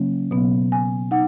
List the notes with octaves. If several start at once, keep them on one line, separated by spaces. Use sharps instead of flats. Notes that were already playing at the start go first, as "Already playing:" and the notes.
Already playing: C#3 F#3 A#3 C#4
B2 F#3 B3
G#5
D#4 F#5